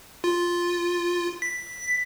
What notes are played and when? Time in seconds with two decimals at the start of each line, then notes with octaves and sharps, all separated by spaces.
0.24 F4
1.42 B6